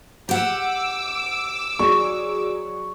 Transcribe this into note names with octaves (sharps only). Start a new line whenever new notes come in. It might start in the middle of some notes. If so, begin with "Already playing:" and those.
G4 F#5 D6 E6
F#3 G#4 D5 C#6